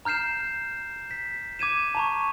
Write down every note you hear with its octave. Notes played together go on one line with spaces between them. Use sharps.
A#5 F6 G6 C7 E7
B6
D6 G#6 D#7 E7
A5 A#5 C#6